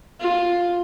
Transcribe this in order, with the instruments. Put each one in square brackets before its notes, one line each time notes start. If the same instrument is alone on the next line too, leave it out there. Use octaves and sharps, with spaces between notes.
[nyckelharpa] F4